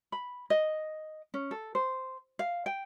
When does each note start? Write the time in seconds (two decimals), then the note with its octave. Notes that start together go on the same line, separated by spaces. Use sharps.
0.12 B5
0.50 D#5
1.34 C#4
1.51 A4
1.75 C5
2.39 F5
2.66 G5